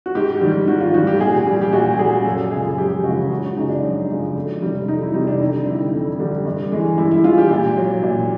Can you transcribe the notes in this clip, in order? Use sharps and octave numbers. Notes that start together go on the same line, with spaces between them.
F#4
G#2 G4
D#3 G3
G#2 F#4
F4
D#3 G3 F#4
G4
A#2 G#4
G3 G4
G4
A#2 F#4
G3 G#4
F#2 A4
C#3 F3 G#3 G#4
F#2 G4
C#3 F3 G#3 F#4
F#2 F#4
F#4
C#3 F3 G#3 D#4
D4
F#2
C#3 F3 G#3
F2
C3 D#3 G3
F2 D#4
E4
C3 D#3 G3 D#4
D4
F2 D#4
D3 G3 E4
F2
D3 G3
G2
E3 G#3
G2 E4
E4
E3 G#3 F4
G4
A#2
F#3
A#2